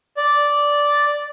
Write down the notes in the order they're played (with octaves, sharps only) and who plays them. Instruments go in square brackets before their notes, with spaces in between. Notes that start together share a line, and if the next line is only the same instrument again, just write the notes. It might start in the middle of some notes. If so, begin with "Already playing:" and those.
[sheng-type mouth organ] D5